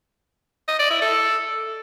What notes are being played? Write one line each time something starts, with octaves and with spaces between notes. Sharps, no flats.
D#5
D5
E4
A4